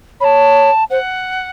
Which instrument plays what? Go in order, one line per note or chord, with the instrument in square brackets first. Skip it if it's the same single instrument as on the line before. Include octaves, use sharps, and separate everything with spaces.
[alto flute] C#5 [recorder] A5 B5
[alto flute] C5 [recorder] F#5